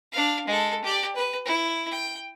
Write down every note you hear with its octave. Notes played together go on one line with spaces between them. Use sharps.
D4 F5
G#3 A4
G4 D5
B4
E4
G5